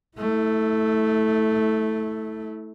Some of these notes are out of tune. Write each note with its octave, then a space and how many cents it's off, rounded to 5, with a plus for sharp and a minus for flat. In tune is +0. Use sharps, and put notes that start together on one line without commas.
A3 +0 E4 -25